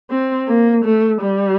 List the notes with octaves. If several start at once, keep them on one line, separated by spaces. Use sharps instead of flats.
C4
A#3
A3
G3